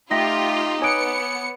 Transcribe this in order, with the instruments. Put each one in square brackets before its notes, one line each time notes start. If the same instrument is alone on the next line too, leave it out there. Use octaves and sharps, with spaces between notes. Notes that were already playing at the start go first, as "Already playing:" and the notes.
[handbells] A3 E5 G5 [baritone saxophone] D#4 [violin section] F4 G4 [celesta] A#6
[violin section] B3 C#7 [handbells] C#5 D6 F#6 [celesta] G#5 D#6 D7